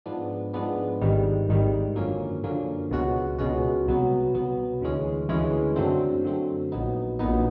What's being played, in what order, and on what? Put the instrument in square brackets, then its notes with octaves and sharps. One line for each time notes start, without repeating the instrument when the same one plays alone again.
[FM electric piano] G#2 F3 G#3 B3 D4
G#2 F3 G#3 B3 D4
G#1 G#2 D#3 G3
G#1 G#2 D#3 G3
F#2 D3 F3 A#3 C#4
F#2 D3 F3 A#3 C#4
C#2 B2 G#3 C#4 F#4
C#2 B2 G#3 C#4 F#4
C2 B2 F#3 B3
C2 B2 F#3 B3
D2 C#3 E3 G#3 C#4
D2 C#3 E3 G#3 C#4
F#2 D3 F#3 A3 C4
F#2 D3 F#3 A3 C4
A#1 A#2 F#3 B3 D#4
A#1 A#2 F#3 B3 D#4